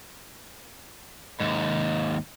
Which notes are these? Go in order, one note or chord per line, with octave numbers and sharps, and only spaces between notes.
D#2 G#2